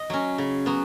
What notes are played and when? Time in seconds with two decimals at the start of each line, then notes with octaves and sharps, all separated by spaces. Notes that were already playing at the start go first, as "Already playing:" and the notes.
Already playing: D#5
0.10 F#3 C#4
0.38 C#3
0.66 F#3 B3